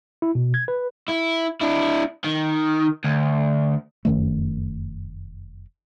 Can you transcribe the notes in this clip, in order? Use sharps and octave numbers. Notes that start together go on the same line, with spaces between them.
E4
B2
G#6
B4
E4
D4 E4
D#3
D2
F1 F#2 D#3 A3